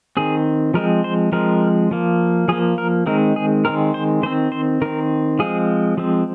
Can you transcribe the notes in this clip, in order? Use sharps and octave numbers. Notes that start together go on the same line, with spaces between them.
D#3 C4 G#4
F3 G#3 C4 A#4
C5
F3 G#3 C4 A#4
F3 A#3
F3 A#3 G#4
A#4
D#3 G#3 C4 A#4
G#4
D#3 G#3 C4 A#4
C5
D#3 C4 C5
C5
D#3 C4 A#4
F3 G#3 C4 G#4
F3 G#3 C4